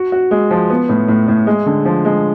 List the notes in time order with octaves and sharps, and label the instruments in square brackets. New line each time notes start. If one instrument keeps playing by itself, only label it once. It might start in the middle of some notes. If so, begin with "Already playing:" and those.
Already playing: [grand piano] F#4
F#4
G#3
F3
B3
A2
A2
A2
G#3
D3
F3
G#3